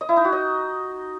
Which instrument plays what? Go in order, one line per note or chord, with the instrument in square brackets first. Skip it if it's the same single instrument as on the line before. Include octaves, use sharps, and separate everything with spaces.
[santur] D#5
E4
D#4
F#4
D#5